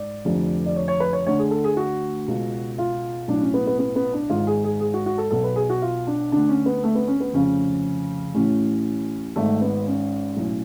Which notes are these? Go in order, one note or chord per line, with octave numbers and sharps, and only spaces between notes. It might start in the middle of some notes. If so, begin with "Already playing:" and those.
Already playing: G#2 D5
F1 F2 D3
D5
C#5
C#5
B4
C#5
D2 D3 C#5
G#4
A4
G#4
F#4
C#2 B2
F4
B1 A2 D4
C#4
B3
B3
B3
B3
D4
G#1 G#2 F4
G#4
G#4
G#4
F#4
F#4
A4
B1 B2 A4
B4
G#4
F#4
F4
D4
D2 D3 D4
C#4
B3
A3
B3
C#4
B3
F1 F2 C#3 C#4
A1 A2 C#4
G#1 G#2 A3
B3
C#4
B1 A2